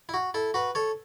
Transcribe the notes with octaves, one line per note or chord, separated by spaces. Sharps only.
E4
F#4
E4 A4
F#4 B4
A4 C#5